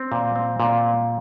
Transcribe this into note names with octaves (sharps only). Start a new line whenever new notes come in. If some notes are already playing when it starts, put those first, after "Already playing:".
Already playing: C4
A#2
C4
A#2